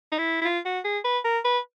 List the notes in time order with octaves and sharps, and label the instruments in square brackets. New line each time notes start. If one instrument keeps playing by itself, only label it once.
[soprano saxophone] D#4
E4
E4
F4
F#4
G#4
B4
A#4
B4